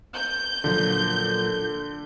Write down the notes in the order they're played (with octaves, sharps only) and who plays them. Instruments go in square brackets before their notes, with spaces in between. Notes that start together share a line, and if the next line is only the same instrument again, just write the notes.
[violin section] G6
[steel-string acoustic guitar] A#2 F3 F#3 [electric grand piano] D3